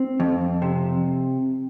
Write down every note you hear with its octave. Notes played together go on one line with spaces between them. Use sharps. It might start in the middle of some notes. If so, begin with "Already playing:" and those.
Already playing: C4
F2
C3